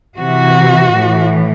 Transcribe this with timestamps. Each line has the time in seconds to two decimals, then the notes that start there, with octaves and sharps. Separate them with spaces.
0.18 C3 E3 F#4
0.94 A2 E3